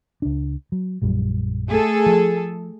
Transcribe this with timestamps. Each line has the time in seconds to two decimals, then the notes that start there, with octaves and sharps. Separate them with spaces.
0.22 C#2 D4
0.72 F#3
1.02 A#1 F#2 G3
1.68 A3 G#4 A4
2.06 F3